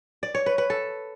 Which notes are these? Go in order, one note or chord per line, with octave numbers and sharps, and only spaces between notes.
D5
C#5
B4
B4
A4